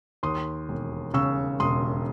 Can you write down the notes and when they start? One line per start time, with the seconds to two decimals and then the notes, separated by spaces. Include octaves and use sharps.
0.23 D#2 C6 D#6
0.69 E1
1.14 C#3 C#6 E6
1.60 E1 C6 D#6